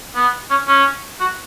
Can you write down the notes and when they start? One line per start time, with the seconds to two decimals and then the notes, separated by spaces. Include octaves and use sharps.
0.16 B3
0.50 C#4
0.68 C#4
1.20 F#4